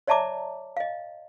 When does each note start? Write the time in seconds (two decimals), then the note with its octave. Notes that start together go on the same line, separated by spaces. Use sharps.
0.07 C#5 D5 E5 A5 A#5 D6
0.77 D#5 F5